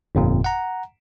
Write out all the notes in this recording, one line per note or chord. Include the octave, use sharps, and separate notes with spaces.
G1 F2 A#2
F#5 A#5